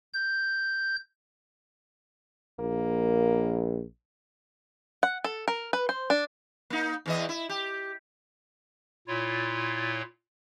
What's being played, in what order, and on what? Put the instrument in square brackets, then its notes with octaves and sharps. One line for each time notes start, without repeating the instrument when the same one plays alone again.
[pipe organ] G6
[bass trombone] A#1 [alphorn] A#3
[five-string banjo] F#5
A4
A#4
B4
C5
D4
[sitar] A#3 D#4
E2 E3 D#5
E4
G4
[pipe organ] A#2 E4 F4 C#5